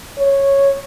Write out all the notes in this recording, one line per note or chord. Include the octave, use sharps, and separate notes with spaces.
C#5